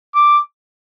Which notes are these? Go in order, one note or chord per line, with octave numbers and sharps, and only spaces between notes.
D6